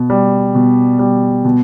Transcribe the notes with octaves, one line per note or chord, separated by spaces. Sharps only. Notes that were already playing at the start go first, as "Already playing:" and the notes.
Already playing: B2
G3
B2
G3
B2